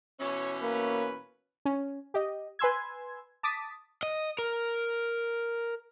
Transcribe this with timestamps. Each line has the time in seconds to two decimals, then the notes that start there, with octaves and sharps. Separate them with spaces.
0.20 B2 E3 C#4 C#5
0.62 A#3 B4
1.65 C#4
2.14 G4 D#5
2.59 B4 G#5 C6 E6 G#6
3.43 A5 D6 D#6 A6 B6
4.03 D#5
4.39 A#4